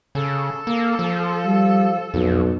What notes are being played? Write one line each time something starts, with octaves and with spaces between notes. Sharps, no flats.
C#3 A4
A#3
F3
G3
B1 F2